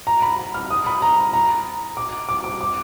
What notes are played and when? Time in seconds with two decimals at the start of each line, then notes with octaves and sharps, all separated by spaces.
0.07 A#5
0.22 B5
0.54 F6
0.70 D#6
0.86 B5
1.02 A#5
1.33 A#5
1.97 D6
2.29 D6
2.44 D6
2.61 D6